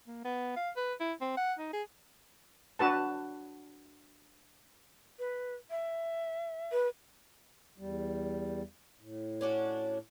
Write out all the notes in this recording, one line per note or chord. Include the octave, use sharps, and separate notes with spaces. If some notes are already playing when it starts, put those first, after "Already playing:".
A#3
B3
F5
B4
E4
C4
F#5
D#4
G#4
D4 F#4 B4 A5
B4
E5
B4
E2 G3
A2
C#4 D4 F#4